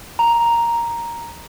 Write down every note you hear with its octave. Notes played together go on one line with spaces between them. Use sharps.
A#5